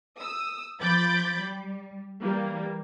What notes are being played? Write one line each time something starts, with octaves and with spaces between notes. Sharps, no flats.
D#6 E6
F3 B5 D6 G6 A6
G3
E3 G3 A#3